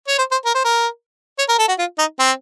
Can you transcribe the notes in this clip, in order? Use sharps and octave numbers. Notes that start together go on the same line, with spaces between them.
C#5
C5
C5
A#4
C5
A#4
C#5
A#4
A4
F#4
F4
D#4
C4